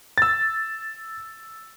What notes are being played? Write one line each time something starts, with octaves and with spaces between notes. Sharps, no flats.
E6 A6